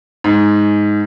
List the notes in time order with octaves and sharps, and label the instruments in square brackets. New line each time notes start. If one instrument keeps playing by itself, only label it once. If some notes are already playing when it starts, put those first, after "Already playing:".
[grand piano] G#2